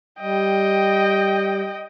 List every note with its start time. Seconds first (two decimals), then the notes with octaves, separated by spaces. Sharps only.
0.20 G3 D#5 G5